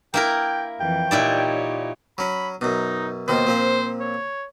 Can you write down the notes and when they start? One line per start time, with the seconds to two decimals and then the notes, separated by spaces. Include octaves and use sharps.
0.14 A#3 E4 A#4 G5
0.80 F2 E3 G5
1.11 A#2 D#4 E4 G4 C#5 D5
2.18 F#3 C#4 B5
2.61 F#2 B2 D#4
3.28 D#2 B2 D#3 C5
3.47 A#2 F3 C4
4.00 C#5